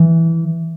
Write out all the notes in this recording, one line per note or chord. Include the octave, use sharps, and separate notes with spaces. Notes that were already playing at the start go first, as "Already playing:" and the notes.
Already playing: E3